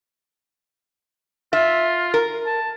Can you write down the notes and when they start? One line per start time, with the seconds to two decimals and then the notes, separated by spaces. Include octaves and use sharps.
1.53 F4 E5
2.14 A#4
2.46 A5